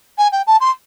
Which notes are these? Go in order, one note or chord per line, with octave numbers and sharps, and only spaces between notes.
G#5
G5
A5
C6